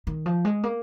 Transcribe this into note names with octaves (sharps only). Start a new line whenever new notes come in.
D#3
F3
G#3
A#3